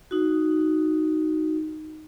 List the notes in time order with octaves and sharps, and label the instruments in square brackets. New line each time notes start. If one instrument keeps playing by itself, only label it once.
[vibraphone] D#4 F#4